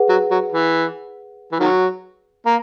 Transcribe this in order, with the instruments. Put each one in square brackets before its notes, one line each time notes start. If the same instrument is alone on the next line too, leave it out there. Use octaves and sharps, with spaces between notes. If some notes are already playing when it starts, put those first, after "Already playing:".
Already playing: [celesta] G#4 B4 F#5
[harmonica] F#3
F#3
E3
E3
D#3 F#3
A#3